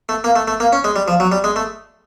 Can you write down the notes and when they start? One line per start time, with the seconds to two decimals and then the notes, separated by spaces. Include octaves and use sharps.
0.09 A3
0.24 A#3
0.36 A3
0.48 A3
0.60 A#3
0.73 C#4
0.84 G#3
0.96 G3
1.08 F3
1.20 F#3
1.32 G3
1.44 G#3
1.56 A3